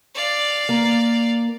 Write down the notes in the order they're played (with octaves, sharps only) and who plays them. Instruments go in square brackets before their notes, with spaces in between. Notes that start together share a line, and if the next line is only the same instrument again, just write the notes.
[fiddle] D5 F5
[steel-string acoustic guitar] A#3